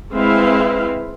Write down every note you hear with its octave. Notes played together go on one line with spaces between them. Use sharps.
G#3 C4 E4 B4 E5 F5